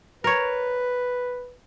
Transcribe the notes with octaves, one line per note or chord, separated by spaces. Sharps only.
A#4 B4 C#5